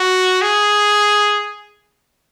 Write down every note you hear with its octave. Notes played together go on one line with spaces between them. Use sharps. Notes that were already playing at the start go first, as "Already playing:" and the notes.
Already playing: F#4
G#4